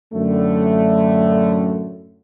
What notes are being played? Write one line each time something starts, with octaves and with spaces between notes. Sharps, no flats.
F#2 A2 D3 A3